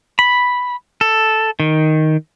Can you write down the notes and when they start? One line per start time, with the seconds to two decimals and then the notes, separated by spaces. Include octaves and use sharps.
0.19 B5
1.01 A4
1.60 D#3